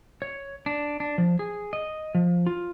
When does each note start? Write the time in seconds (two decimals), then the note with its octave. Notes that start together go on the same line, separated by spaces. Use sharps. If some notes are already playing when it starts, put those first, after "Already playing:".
0.22 C#5
0.66 D4
1.00 D4
1.18 F3
1.39 G#4
1.73 D#5
2.15 F3
2.47 F4